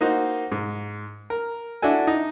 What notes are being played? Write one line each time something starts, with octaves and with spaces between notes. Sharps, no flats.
A#3 D#4 F#4 C5
G#2
A#4
D4 E4 F#4 A4 G#5
D#4